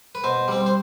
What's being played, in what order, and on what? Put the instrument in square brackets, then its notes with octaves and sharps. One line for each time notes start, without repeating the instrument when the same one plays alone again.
[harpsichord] B4
B2 C5
G3 C4
C5